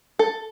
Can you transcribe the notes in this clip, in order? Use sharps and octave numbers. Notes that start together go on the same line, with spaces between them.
A4